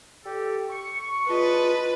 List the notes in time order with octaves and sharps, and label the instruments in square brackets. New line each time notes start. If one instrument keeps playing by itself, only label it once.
[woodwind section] G4 A4
C#6
[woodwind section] E2 D#5 A5 [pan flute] F4 [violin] B4